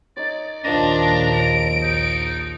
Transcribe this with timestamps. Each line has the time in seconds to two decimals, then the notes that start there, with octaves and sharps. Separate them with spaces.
0.17 D#4 C#5 D5
0.64 A#1 D#2 D#3 F3 D4 A#5
1.34 D7
1.83 D#4